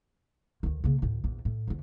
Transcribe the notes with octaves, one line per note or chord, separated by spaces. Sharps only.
D2 D#3
C#3 A#3
D2 A2
A#1 E2
A2
F2 D3